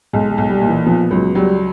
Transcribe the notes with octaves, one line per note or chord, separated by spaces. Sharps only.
B1 G#3
G#3
B1
G3
A#2
E3
F3 B3
C#2 F#3
F#3 G3